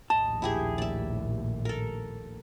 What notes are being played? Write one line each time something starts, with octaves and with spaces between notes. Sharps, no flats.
A#1 D#2 A2 D#5 A5
E4 G4 G#4
D5 E5
A4 A#4